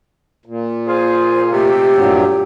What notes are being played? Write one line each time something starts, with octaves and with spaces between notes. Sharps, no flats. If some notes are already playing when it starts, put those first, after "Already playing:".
A#2
F4 G#4 C5
C3 G#3 A3 G4
G2 A#2 F#3